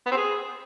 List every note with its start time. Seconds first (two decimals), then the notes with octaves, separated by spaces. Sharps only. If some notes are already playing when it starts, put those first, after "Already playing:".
0.06 B3
0.12 C4
0.17 G#4